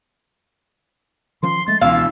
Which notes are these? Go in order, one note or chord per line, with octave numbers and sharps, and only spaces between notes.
D#3 F3 C#4 C6
G#3 A3 A6
C#2 B2 E3 C#4 F5 E6